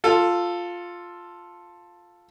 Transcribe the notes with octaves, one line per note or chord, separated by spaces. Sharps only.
F4 A4